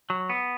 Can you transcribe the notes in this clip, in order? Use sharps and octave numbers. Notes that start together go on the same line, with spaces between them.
F#3
B3